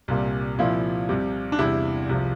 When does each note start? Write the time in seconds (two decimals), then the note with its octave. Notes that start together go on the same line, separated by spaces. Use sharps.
0.08 C2 A#2 G3
0.58 C2 A#2 F3 E4
1.09 C2 C3 G3
1.52 D4
1.59 E2 C3 G3 E4
2.09 C2 C3 F3